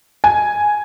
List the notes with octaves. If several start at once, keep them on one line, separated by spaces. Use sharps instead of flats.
G#5